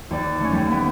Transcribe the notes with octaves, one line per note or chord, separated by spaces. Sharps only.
D#2 D5
A3 C#4
D#2 G3
A#3 B3